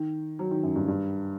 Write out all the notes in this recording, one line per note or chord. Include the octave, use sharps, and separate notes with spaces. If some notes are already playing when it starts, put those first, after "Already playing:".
Already playing: D#3
F#3
D#3
F#2
G2
G2